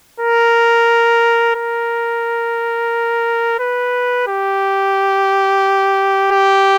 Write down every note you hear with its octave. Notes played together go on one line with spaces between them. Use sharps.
A#4
A#4
B4
G4
G4